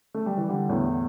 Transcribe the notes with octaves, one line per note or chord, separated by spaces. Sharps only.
A3
G3
E3
D3 G3
E2 A2